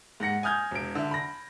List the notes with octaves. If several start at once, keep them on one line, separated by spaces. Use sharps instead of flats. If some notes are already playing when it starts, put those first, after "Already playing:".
G#2 F#5 A#6 C#7
G#5 D#6 F6 G6 G#6
E1 D7
D3 E5
B5 A#6